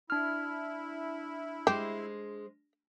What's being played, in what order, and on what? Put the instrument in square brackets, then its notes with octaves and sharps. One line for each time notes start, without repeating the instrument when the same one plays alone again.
[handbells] D4 F6 [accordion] E4
[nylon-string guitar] G#3 C5 [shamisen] G4